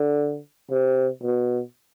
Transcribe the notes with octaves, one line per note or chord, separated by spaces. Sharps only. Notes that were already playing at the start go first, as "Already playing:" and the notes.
Already playing: D3
C3
B2